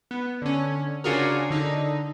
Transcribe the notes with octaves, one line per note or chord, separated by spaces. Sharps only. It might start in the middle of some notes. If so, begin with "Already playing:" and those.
B3
D3 C#4
C#3 D4 F4 F#4 G#4 A#4
D3 D#4